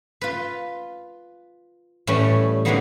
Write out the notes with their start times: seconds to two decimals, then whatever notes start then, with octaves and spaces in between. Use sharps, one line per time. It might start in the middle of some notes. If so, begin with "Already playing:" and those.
0.21 F4 B4
2.07 A2 E3 G3 C#4
2.65 D3 F#3 G#3 A#3 B3 D#4